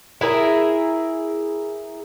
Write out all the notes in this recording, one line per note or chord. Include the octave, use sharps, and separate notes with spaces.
E4 G#4 A#4 E5